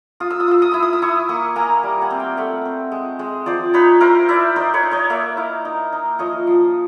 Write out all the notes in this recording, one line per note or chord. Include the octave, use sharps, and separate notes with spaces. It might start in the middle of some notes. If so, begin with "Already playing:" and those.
F4 D#6
E6
D#6
F4 E6
D#6
E4 E6
D#6
E6
E4 C#6 D#6
A#3 C#6 D#6
A#3 G#5 A#5
G3
F#5 G#5
C4
F5 G5
A3 E5 F#5
C4
G#3
G#3
F3 C5 D5
D#4 B4 C#5
E4 A#4 C5
E4 D5 E5
D#4 C5 D5
B4 C#5
D#4
C#5 D#5
A#3 D5 E5
E4 D#5 F5
D#4
D#4
F3 C#5 D#5
F3